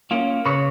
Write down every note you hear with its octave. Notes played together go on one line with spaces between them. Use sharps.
A#3 C#4 F4
C#3 B4 C#5